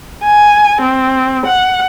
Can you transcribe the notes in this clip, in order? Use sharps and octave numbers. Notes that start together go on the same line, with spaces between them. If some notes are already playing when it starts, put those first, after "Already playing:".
G#5
C4
F#5